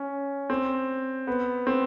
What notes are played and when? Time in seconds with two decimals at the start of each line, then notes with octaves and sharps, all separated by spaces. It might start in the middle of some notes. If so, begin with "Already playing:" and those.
Already playing: C#4
0.50 C4
1.27 B3
1.67 C4